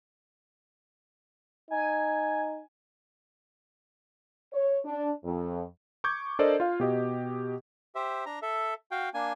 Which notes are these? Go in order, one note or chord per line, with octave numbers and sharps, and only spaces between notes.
D#4 G#5
C#5
D4
F2
C#6 D6 G6 G#6
D4 A4 A#4 C5 D5 D#5
F4 F5
B2 G4 D#5
G4 C5 E5
D4 A#5
A4 E5
F#4 F5 G5
A#3 D4 G#5